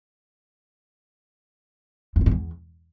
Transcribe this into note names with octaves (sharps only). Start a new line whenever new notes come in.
F#2
D3
G#2
E2